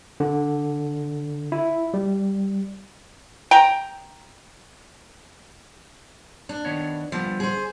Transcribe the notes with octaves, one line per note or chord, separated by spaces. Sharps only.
D3
E4
G3
G5 A#5
D4
D#3 B3 C#5
D3 F3 G3 B3
G#4 C5